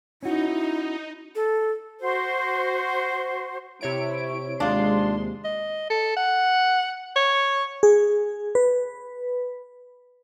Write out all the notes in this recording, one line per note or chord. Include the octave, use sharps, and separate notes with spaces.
C#4 D#4 E4 F#4
A4
F#4 C5
C3 E4 C#5 D7
D#2 C3 G#3 D4 F4 C6
D#5
A4
F#5
C#5
G#4
B4